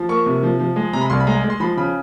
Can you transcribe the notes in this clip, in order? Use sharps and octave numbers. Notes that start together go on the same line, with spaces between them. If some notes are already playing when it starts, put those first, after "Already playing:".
Already playing: F3
A#3 C#6
C3
F3
F3
G#3
C3 A#5
B5
C2 C6
B5
G#3 A#5
G#3
C6
F3 B5
C#3 B5